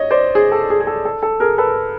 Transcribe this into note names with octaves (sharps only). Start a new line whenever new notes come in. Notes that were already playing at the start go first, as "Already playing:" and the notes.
Already playing: C#5 D#5
C5 D5
G#4
A4
G#4
G#4
A4
A4
A4
G#4 A#4
A4 B4